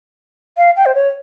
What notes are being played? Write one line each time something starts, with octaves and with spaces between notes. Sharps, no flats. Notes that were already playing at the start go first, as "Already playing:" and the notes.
F5
G5
C5
C#5